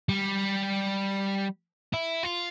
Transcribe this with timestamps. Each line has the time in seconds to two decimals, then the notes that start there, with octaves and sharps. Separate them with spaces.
0.09 G3
1.93 E4
2.24 F4